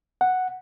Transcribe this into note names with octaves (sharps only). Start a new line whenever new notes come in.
F#5